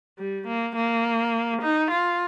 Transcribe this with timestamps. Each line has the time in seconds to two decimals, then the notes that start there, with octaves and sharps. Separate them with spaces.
0.18 G3
0.47 A#3
0.76 A#3
1.62 D#4
1.91 F4